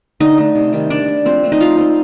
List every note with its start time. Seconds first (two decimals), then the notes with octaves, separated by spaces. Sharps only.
0.20 D3 D#4 D#5
0.38 A3 D#4
0.55 C3
0.73 D#3 G3
0.90 G3 D4 D5
1.08 D4
1.25 F3 C4 C5
1.43 A3 D4
1.52 D#4 D#5
1.60 F3 F4 F5
1.78 C4 D#4